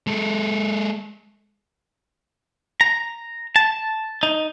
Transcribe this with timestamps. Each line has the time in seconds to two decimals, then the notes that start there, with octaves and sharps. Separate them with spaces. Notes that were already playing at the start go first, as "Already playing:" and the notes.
0.07 G#3 A4
2.81 A#5
3.56 A5
4.23 D#4